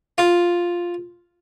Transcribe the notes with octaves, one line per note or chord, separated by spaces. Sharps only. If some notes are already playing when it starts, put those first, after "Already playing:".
F4